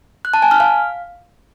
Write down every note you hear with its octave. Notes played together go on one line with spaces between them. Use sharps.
F#6
A5
G#5
F6
F5